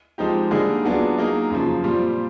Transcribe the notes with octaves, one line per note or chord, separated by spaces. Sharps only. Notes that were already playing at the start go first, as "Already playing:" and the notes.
F3 G#3 C4 D#4 G4
D3 G3 A#3 D#4 G#4
F#3 B3 D4 F4 G#4
F#3 A#3 D#4 G#4
F#2 C#3 F3
A#2 G3 C4 F4